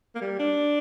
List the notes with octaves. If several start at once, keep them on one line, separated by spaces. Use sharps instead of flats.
A#3
G3
D4